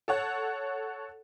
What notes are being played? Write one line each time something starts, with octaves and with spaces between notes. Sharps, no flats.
A4 C#5 F#5